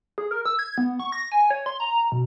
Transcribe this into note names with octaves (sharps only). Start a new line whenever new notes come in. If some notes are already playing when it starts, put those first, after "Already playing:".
G#4
A#4
E6
G#6
B3
C#6
A#6
G#5
C#5
C6
A#5
B2